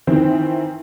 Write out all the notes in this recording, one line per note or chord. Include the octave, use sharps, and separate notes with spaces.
D#3 E3 C4